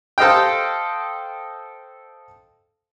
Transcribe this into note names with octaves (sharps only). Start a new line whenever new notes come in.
A4 C5 D#5 F5 G5